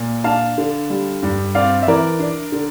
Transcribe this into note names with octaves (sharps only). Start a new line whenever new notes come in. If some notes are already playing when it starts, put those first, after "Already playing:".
Already playing: A#2
D4 F5 A5
D3
G3
G2
C4 D5 F5
E5
E3 A#4 D5
D4
D3